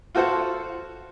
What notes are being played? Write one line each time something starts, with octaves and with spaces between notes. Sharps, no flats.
F4 F#4 A4 C5 F5 F#5